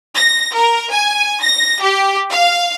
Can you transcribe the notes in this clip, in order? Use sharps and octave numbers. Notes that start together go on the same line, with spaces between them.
A#6
A#4
G#5
A#6
G4
F5